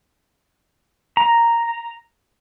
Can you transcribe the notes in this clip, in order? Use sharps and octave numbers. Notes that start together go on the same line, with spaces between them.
A#5